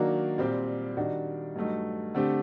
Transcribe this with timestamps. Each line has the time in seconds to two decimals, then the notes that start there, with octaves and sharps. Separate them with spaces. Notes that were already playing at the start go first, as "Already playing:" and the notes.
Already playing: D#3 F#3 A#3 D4 F#4
0.38 A#2 G3 C4 G4
0.97 D#3 G3 D4 F#4
1.56 G2 F#3 A3 D#4
2.15 D3 A3 C4 G4